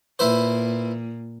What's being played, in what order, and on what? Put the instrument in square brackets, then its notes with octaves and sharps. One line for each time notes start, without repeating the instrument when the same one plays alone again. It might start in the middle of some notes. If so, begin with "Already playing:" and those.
[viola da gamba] A#2 [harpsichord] E4 B4 C5